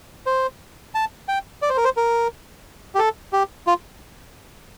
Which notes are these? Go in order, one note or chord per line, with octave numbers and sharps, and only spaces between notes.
C5
A5
G5
D5
C5
A#4
C5
A#4
G4
A4
G4
F4